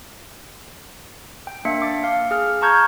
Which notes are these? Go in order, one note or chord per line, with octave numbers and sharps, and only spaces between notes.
G5
A#3 D4 E5 G5 C#7
D6 A6
F5
G#4 F6
A5 A#5 C#6 F6 G6 G#6